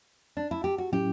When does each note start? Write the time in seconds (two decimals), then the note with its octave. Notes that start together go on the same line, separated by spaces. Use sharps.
0.37 D4
0.51 E4
0.64 G4
0.78 F#4
0.92 A2 F#3 C#4 E4 G4